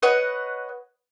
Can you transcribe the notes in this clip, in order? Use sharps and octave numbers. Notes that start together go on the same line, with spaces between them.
B4 C#5 D#5 F#5